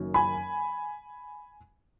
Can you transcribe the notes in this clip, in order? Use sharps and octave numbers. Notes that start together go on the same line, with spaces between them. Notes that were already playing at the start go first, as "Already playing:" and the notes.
Already playing: F#1 F#2 D#3 F#3
G#5 B5